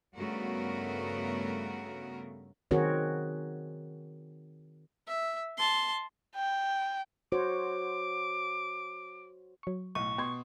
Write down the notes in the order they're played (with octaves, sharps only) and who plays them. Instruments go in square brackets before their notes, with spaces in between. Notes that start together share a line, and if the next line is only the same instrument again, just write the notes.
[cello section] G2 C#3 A3 B3 F#4 A#4
[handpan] D#3 C4 F#4 G#4 A#4 C#5
[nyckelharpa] E5
A5 C6
[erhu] G5
[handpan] F#4 C5 C#5 [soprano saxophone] D6
[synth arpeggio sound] F#3 C#6
[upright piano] B1 A2 [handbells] C#6 [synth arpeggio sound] D#7
[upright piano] B2 C6 [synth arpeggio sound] G5 G#6